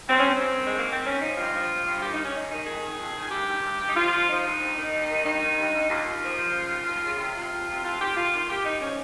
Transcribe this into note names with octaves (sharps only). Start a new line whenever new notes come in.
G2 C4
C#4
G2
C4
G2
D#3
G#3
G#2
A#3
G#2 C4
G#2 C#4
F3 D#4
G2 F4
F3
F3
G2
D#3 G4
D#4
D#3
C#4
G#2 D#4
D#3 D#4
F2 G#4
D#3
F2
D#3
G2 G4
D#3
G2
G2
D#4
F3 F4
F3
F3 D#4
G2
D#2
D#3
D#2
D#3
G2 D#4
D#3
G2
G2
D#2 F4
D#2
F3
F3
C#3
D#2
D#2
C#3
C3 F4
C3
F2
C3
F2 F4
D#3 G4
F2 F4
D#3 F4
D#2 G4
D#2 D#4
F3 C#4